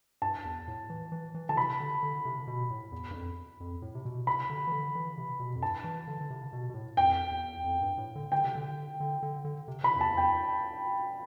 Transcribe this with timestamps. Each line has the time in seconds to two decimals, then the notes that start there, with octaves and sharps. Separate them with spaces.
0.22 G2 A5
0.45 E2
0.68 A2
0.90 E3
1.12 E3
1.34 E3
1.49 D3 A5
1.57 C3 B5
1.80 D3
2.03 D3
2.25 C3
2.47 B2
2.70 A2
2.92 E2
3.11 G2
3.14 F2
3.60 F2
3.82 A2
3.95 C3
4.05 B2
4.27 C3 B5
4.50 D3
4.67 E3
4.72 D3
4.95 E3
5.18 C3
5.40 B2
5.56 F2
5.62 G2 A5
5.84 E3
6.07 D3
6.21 D3
6.30 C3
6.53 B2
6.70 B2
6.74 A2
6.97 F2 G5
7.31 E2
7.64 F2
7.81 G2
7.98 A2
8.15 D3
8.32 D3 G5
8.44 C3
8.55 D3
9.00 D3
9.23 D3
9.45 D3
9.68 C3
9.83 C3 B5
9.96 F2
10.00 E2 A5
10.17 E2 G5